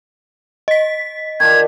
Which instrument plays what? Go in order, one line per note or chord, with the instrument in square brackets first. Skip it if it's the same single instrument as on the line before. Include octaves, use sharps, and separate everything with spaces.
[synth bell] D#5 B6
[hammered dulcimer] D#3 D4 F4 [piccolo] G#6